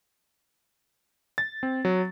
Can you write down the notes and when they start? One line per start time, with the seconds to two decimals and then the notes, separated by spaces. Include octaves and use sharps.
1.38 A6
1.63 C4
1.85 F#3